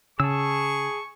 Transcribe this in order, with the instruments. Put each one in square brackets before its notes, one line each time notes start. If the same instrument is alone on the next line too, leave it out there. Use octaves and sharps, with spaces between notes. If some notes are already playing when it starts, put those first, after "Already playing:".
[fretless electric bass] C#3 [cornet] G#4 [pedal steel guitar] A5 E6 [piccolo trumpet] C#6